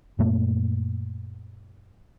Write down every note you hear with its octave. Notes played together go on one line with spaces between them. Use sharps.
F#2 A#2 A3 A#3